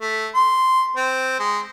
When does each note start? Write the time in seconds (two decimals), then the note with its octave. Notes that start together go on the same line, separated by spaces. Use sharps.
0.01 A3
0.35 C6
0.96 C4
1.39 G#3